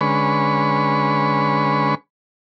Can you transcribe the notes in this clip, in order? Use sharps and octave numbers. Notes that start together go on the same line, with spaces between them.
D3 G#3 C#4 B4 B5 C#6